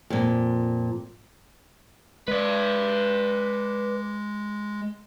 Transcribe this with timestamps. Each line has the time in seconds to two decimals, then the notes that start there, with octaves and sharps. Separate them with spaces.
0.10 F2 A#2
2.28 G#3 B4 D5